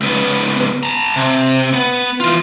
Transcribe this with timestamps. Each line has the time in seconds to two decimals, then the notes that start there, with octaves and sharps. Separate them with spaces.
0.01 C#2 B3
0.83 A5 A#5
1.16 C3
1.73 B3
2.20 E3 F4